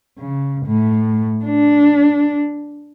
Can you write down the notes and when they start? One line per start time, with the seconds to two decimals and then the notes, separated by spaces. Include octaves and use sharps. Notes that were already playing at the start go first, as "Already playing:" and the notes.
0.19 C#3
0.66 A2
1.45 D4